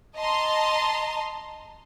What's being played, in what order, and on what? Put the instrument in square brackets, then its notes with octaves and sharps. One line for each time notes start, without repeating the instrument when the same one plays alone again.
[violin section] D#5 A5 A#5 C6